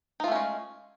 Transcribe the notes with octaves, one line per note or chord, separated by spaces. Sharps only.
G#3 A3 C#4 D#4 F4